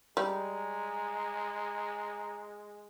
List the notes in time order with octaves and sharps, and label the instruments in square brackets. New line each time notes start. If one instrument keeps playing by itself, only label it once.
[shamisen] G3 [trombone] G#3 [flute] A#5